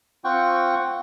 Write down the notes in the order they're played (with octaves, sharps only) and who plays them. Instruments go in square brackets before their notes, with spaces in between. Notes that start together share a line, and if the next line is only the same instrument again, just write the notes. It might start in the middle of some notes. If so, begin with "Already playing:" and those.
[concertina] C4 F4 F#5 G5 C#6